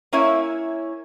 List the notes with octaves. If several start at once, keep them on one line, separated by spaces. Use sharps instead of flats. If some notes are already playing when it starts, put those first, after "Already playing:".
A#3 C#4 E4 C#5 E5